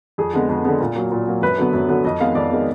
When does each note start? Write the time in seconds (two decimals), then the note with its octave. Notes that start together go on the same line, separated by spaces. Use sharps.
0.18 F2 G#4
0.33 D3 G#3 B3
0.49 F2
0.65 D3 G#3 B3
0.81 A#2
0.95 F#3 A#3
1.12 A#2
1.27 F#3 A#3
1.42 F#2 B4
1.58 D3 F#3 B3
1.73 F#2
1.89 D3 F#3 B3
2.04 F2 D#5
2.20 D#3 G#3 B3 F5
2.35 F2 D5
2.51 D#3 G#3 B3